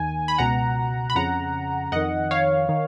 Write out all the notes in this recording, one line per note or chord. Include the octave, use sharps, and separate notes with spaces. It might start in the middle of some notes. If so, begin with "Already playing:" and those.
Already playing: D#2 D#3 G#5
B5
C#2 B2 F#5 A#5
B5
F2 C#3 F#5 A#5
F2 D#3 D#5 F#5
C#5 F5
D#3